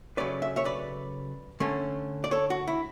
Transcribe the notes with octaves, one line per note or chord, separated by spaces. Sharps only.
C#3 F#3 A3 C#4 B4 D5
E5
C#5 E5
B4 D5
D3 A3 C#4
D5
A4 C#5
F#4
E4